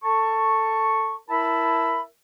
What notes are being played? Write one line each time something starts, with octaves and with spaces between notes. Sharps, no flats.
A4 A5 C#6
E4 A#4 E5 A5 B5